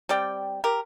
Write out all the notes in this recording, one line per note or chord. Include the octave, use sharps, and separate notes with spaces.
G3 C4 D5 G5
G4 A#4